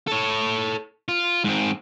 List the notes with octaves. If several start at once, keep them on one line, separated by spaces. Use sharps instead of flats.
A4 C#5
F4
G#2 C4